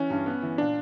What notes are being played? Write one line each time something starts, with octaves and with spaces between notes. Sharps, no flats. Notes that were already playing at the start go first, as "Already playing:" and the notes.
Already playing: E3 C#4
G2
B3
E3
A#2 D4